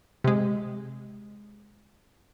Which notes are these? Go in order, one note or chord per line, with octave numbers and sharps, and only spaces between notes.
C3 G#3